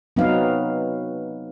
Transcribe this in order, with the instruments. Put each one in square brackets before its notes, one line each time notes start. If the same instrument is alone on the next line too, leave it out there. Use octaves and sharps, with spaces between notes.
[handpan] F#3 B3 C4 D#4 B4 F5